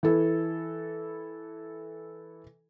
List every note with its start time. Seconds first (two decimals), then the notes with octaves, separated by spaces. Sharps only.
0.03 E3 E4 A4